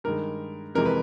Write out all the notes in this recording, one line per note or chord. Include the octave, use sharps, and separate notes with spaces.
G2 D#3 G#3 A#4
F2 C3 E3 G#3 A#4
B4